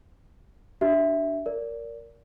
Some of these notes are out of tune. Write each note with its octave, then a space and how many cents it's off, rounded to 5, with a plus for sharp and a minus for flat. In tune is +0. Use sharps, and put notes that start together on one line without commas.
D4 +0 G4 -45 E5 +0
A#4 +0 D5 -25